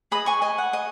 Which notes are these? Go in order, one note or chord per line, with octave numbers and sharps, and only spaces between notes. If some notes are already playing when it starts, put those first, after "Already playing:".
G#4 B4 D#5 B5 D#6
G#5 C#6
D#5 G#5
F#5
D#5